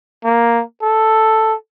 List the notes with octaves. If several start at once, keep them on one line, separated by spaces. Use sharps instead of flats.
A#3
A4